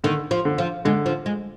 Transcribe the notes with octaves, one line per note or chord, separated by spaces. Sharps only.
D3 D#3
F3
D3
F3
D3 G#3
F3
G#3